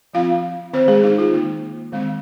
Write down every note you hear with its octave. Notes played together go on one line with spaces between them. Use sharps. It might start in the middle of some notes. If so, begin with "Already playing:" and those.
F3 C4 F4 F5
D#3 C4 C5
G#3 G#4
D#4
F4
D#3 A#3
D#3 G#3 C4